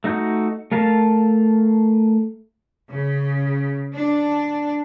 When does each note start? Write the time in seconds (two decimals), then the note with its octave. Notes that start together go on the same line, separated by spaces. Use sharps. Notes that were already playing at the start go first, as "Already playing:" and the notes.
0.04 A3 D#4 F#4 G6
0.72 A3 A#4 F5 A5
2.91 C#3
3.94 D4